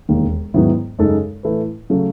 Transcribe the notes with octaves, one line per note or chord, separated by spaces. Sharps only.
E1 D#2 D#3
G#2 D#3 F#3 B3 E4
F#2 C#3 G#3 D#4 A4
A2 E3 A3 E4 B4
C#3 F#3 A3